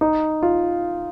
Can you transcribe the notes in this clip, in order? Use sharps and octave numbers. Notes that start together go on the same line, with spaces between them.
D#4
F4